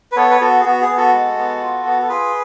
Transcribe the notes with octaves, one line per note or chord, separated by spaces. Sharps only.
B4
B3 A4 C#5
B4
B3 F#4 A4
G#4
B3 F#4
G#4
B3
F#4 A4
G#3
B3
F4
B3
A4
F4 G#4 B4